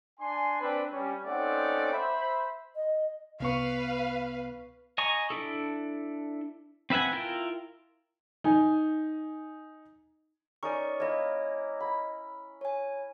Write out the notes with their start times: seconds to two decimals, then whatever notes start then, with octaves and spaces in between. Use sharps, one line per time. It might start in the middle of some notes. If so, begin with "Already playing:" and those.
0.20 D4 G#5 C6
0.60 C4 D4 B4
0.92 G3 C#4
1.25 A3 C4 C#4 D#4 D5 F#5
1.93 C5 E5 B5
2.75 D#5
3.40 C2 B3 B4 F5 C#6
4.98 D#5 G#5 A#5 C#6
5.30 D4 E4 A4
6.90 C4 B4 E5 F#5 G#5
7.13 E4 F4 A#4 G5
8.44 D#4 G#5
10.63 C#4 D#4 A#4 D5 C#6
11.00 A#3 E4 C#5 D#5
11.80 B5
12.61 C#5 G#5